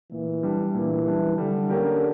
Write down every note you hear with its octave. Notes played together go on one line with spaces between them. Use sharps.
A#2 E3
G3 D4
A#2 E3
G3 D4
D3 G3
A#3 C#4 G4 A#4